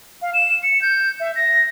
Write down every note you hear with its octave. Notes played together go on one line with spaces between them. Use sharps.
F5
E7
C#7
G6
E5
A#6